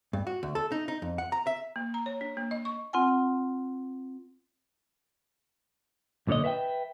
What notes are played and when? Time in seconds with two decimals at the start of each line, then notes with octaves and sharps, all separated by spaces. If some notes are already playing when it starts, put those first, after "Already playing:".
0.13 G2
0.27 F#4
0.43 D2
0.55 A4
0.72 D#4
0.88 D#4
1.02 F2
1.18 F#5
1.32 A#5
1.47 E5
1.76 A#3
1.94 A#5
2.06 C#5
2.21 D4
2.37 A#3
2.51 D#5
2.65 C#6
2.93 C4 F4 F#5 G#5
6.27 B1 A#2 D3 C#5 D#5
6.44 B4 E5 F#5 G5